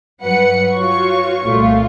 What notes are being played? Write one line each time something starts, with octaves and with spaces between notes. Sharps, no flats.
G2 F#3 B4 F#5 C#7
F4 F#4 C#5 C#6
C2 A#2 A3 F4